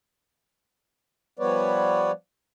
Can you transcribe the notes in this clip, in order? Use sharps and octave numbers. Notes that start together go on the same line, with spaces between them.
F3 G3 B3 B4 C#5 D5